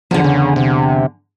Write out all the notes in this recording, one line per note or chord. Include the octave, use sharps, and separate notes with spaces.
E2 D3 F3
C#3
C3